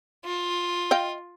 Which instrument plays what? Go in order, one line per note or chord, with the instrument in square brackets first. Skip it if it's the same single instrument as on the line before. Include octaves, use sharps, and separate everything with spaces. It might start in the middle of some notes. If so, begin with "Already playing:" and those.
[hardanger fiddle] F4
[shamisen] D#5 F5 G5